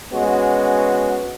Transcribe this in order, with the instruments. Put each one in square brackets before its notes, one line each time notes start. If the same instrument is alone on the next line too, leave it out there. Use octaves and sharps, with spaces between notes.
[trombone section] G#3 B3 C#4 F#4